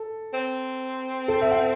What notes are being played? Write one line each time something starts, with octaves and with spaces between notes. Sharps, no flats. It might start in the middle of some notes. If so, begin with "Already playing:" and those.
Already playing: A4
C4
A4
E5
F#5